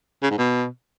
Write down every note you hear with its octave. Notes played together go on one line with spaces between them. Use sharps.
C#3
G#2
B2